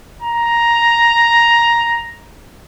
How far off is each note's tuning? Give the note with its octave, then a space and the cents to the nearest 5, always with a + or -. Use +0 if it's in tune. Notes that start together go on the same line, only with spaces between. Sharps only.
A#5 +5